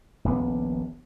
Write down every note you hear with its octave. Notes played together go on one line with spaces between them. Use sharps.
D#1 A#1 C3 B3